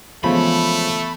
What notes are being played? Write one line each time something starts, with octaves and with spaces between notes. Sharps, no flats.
C#3 E3 F3 G#3 A3 B3 B5